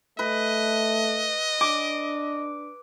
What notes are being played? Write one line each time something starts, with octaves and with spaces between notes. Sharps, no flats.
A3 B4 D#5
D4 D6